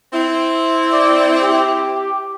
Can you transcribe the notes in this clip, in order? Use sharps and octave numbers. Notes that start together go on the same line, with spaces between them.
C4 E4
D5
G4